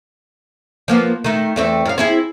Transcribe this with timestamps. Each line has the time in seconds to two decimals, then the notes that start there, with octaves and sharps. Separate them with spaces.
0.88 F3 A#3 B3
1.24 D#3 A3
1.56 E2 A3 C4
1.85 F#2 F5
1.98 C4 E4 G#4